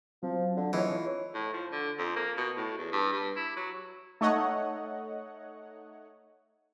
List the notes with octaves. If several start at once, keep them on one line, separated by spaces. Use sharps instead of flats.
F3 F#3 C4
D3
E3 G#3 D#4 F4 C#5
A2
F3
D3
F2
A#3
B2
A2
E2
G2
G2
E4
F#3
A3 D#4 C#5 D#5 F#5